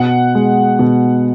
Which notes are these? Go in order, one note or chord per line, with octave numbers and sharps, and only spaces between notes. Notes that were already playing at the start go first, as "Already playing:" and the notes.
Already playing: B2 F#5
G#3
B2